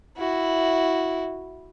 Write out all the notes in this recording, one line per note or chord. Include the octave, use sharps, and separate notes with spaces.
E4 F#4